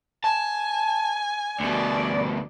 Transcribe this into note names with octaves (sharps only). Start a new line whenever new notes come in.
G#5 A5
D2 B2 D5